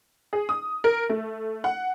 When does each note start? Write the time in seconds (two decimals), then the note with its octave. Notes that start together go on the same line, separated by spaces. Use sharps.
0.33 G#4
0.49 D#6
0.84 A#4
1.09 A3
1.64 F#5